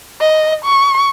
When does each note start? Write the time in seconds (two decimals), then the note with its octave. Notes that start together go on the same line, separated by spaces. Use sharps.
0.21 D#5
0.65 C#6